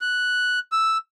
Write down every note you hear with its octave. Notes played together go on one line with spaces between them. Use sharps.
F#6
E6